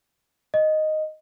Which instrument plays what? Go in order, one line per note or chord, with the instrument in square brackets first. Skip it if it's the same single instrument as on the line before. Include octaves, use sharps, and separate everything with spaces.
[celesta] D#5